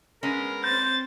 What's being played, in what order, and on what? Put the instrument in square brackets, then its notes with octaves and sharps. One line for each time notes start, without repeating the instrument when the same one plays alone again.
[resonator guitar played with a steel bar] G#3 B3 C#4 [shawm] A#4
[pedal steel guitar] C4 G6 [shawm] C5 [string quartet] A6